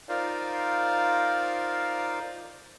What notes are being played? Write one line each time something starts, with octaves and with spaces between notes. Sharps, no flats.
D#4 F4 A#4 C5 D5 F5